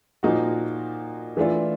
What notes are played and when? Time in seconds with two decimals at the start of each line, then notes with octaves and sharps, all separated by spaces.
0.23 A#2 F3 A#3 D#4 F#4
1.37 E3 A3 D4 F4